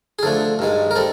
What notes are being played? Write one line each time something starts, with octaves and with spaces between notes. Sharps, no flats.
G#4
D3 F3 A3 D4 A4
G2 D#3 G#3
A#4
G3 C4 A4